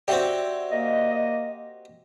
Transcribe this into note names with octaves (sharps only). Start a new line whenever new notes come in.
C4 F#4 G4 D5 E5
A#3 D#5